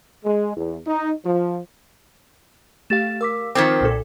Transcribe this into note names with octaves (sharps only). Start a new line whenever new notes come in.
G#3
E2
D#4
F3
A3 G4 F5 A6 E7
A#4 F5 D6 E6 B6
D#3 F3 C4 D6 G#6 B6
B1 A#2 A4